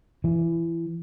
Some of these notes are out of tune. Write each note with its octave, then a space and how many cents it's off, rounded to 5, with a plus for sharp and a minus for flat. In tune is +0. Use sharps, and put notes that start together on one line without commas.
E3 +20